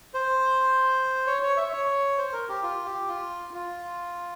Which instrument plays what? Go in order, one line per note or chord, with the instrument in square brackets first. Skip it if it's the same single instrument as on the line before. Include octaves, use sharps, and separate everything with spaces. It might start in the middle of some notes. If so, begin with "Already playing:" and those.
[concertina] C5
C#5
C#5
E5
C#5
C5
A#4
G4
F4
G4
F4
F4